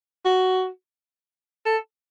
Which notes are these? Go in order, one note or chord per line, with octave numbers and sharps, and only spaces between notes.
F#4
A4